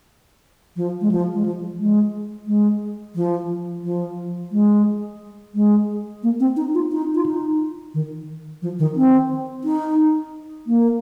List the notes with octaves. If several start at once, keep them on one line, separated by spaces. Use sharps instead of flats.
F3
G#3
F3
G#3
F3
G#3
G#3
F3
F3
G#3
G#3
A#3
C4
D#4
F4
D#4
F4
D#4
D#3
F3
D#3
C4
D#4
A#3